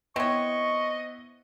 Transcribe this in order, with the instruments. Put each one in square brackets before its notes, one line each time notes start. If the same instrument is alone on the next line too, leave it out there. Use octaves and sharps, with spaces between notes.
[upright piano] B3 E4 [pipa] C4 C#5 [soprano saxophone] D#5 [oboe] C#6